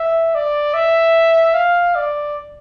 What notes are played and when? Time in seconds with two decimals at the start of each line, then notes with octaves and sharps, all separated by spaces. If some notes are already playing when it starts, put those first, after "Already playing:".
Already playing: E5
0.35 D5
0.74 E5
1.54 F5
1.95 D5